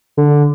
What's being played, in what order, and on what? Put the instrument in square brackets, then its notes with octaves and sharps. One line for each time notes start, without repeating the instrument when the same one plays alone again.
[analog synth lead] D3